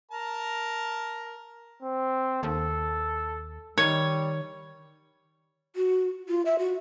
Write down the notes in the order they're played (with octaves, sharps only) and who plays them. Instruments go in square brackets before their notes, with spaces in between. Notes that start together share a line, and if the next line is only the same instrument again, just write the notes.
[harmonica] A#4 A5 A#5
[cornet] C4
[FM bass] D#2 [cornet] A4
[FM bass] D#3 [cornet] G3 [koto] C#5
[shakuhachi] F#4
F4
E5
F#4